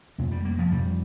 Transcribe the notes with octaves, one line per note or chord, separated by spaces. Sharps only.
F2 C3 A#3
G3
A#3
F3
F2 C3 G3